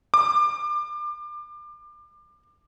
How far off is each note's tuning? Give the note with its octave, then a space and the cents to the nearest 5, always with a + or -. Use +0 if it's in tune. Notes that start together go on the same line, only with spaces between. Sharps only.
D6 +25